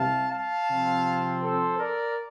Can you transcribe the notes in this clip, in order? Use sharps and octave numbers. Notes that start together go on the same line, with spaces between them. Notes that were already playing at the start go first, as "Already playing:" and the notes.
Already playing: C2 C3 G3 F5 A5
F5 A5
C3 F3 C4
A4 C5
A#4 D5